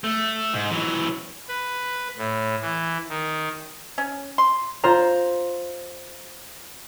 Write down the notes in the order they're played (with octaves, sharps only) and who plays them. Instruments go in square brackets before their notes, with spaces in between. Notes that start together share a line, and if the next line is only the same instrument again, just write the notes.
[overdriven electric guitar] A3
G#2
E3 F#3
[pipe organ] B4
A2
E3
D#3
[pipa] C#4
C6
[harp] F4 C5 A#5